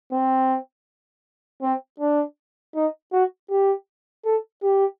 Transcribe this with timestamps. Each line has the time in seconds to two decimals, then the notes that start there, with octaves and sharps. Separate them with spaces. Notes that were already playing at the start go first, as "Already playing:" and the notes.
0.12 C4
1.62 C4
2.00 D4
2.75 D#4
3.12 F#4
3.50 G4
4.25 A4
4.63 G4